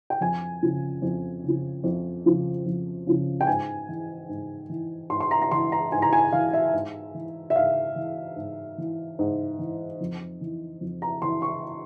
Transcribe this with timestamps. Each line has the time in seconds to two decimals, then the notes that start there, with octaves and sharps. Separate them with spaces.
0.10 G5
0.21 F2 G#5
0.63 C#3 F3
1.02 F2
1.44 C#3 F3
1.84 F2
2.25 C#3 F3
2.66 F2
3.07 C#3 F3
3.41 G5
3.47 G#2 G#5
3.89 E3
4.29 G#2
4.69 E3
5.10 G#2 C6
5.20 C6
5.31 A#5
5.42 A#5
5.51 E3 C6
5.72 A#5
5.92 G#2 G#5
6.02 A#5
6.13 G#5
6.32 E3 F5
6.53 E5
6.73 G#2
7.14 E3
7.50 E5
7.56 G#2 F5
7.96 E3
8.36 G#2
8.78 E3
9.19 G#2
9.59 E3
10.00 F2
10.41 E3
10.81 F2
11.02 A#5
11.22 E3 C6
11.42 C#6